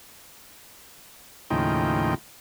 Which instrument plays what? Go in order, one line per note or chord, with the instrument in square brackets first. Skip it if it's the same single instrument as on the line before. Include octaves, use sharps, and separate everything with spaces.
[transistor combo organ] D#2 A2 C#3 F3 D#4 G5